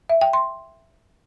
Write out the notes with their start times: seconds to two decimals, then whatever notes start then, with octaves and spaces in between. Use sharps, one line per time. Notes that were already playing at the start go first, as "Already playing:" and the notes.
0.10 E5
0.21 G5
0.33 C6